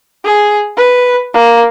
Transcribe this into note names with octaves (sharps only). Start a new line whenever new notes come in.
G#4
B4
A#3